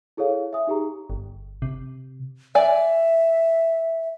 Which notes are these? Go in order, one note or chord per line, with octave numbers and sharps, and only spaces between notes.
E4 G#4 A4 C#5 F5
E5 G#5 D#6
D#4 G4 G#4 A#5
G1
C3
D5 E5 G#5